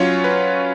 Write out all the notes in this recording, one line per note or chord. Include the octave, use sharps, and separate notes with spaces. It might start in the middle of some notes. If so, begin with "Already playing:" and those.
Already playing: F#3 C#4 F4 C#5
B4